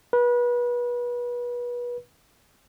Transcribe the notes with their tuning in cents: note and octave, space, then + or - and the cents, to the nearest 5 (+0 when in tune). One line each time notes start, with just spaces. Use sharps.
B4 -30